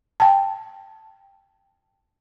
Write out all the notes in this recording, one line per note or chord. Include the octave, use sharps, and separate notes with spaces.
G5 A5